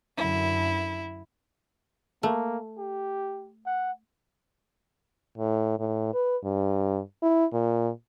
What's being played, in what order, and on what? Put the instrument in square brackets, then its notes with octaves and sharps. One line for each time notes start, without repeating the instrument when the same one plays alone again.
[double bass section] F#2 D3 [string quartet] E4
[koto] A3 [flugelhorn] A#3
[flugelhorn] G4
F#5
[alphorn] A2
A2
B4
G2
E4
A#2